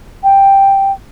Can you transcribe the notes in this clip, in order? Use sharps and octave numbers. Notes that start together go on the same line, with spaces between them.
G5